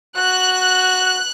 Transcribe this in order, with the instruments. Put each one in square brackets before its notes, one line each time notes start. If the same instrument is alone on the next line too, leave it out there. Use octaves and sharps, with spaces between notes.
[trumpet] F#4 [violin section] F#6